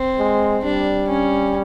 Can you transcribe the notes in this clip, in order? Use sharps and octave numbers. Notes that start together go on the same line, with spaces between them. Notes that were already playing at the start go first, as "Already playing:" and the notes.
Already playing: C4
G#3
G3 D4
C#4